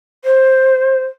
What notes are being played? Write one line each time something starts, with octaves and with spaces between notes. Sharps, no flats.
C5